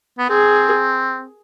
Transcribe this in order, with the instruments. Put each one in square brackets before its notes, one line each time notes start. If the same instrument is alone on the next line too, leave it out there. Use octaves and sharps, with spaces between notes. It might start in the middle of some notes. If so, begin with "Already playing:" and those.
[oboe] B3
[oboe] C4 [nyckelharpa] G#4